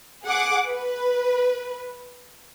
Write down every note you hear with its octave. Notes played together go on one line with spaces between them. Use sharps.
G#4 F#5 D6
B4